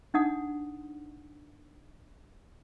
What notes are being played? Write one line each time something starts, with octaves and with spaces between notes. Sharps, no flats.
D4 D#4 F#5 D#6